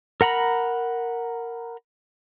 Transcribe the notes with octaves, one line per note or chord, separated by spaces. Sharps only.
A#4 F#5 A#5 B5